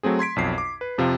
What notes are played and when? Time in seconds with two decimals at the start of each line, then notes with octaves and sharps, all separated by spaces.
0.03 F#3 A3 C4 G#4
0.19 C6 G#6 B6 D7
0.36 B1 F2 C7
0.58 D6
0.81 B4
0.98 F2 C3 F3 F4 F5